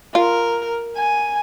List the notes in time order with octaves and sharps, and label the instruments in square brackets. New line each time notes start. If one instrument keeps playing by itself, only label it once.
[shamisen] F4 [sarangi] A#4
[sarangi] G#5